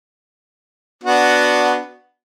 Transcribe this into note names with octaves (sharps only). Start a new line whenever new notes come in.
B3 D4 F#4